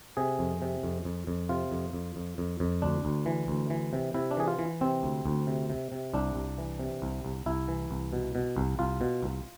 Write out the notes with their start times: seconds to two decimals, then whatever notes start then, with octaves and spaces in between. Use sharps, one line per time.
0.17 C3 G#4
0.39 F2
0.62 C3
0.83 F2
1.05 F2
1.27 F2
1.49 C3 F4
1.71 F2
1.93 F2
2.16 F2
2.38 F2
2.60 F2
2.82 D2 D4
3.05 D2
3.26 E3
3.48 D2
3.70 E3
3.93 C3
4.14 C3 E4
4.31 D4
4.37 E3 G#4
4.48 F4
4.59 E3
4.81 C3 C4
5.03 D2
5.26 D2
5.47 C3
5.70 C3
5.92 C3
6.14 C2 D4
6.36 C2
6.58 E3
6.79 C3
7.02 C2
7.25 C2
7.46 C2 E4
7.68 E3
7.91 C2
8.13 B2
8.35 B2
8.56 C2
8.79 C2 F4
9.01 B2
9.22 C2